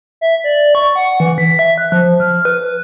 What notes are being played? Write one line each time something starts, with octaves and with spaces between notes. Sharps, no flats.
E5
D5
C#6
F#5
E3
B6
E5
F#6
F3
F6
B4